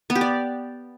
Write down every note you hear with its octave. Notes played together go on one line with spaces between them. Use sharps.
B3
G4
D5